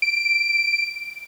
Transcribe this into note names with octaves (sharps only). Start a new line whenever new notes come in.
D7